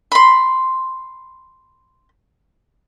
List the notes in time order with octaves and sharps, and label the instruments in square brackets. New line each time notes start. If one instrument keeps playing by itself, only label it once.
[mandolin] B5 C6